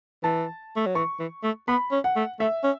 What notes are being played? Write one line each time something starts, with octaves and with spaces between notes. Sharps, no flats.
E3 A5
A3
F#3
E3 C#6
E3
A3
B3 B5
C#4
F#5
A3
A3 E5
C#4